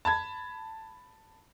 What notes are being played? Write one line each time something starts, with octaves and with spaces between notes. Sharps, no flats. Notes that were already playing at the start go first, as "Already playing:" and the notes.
A5 B5 G#6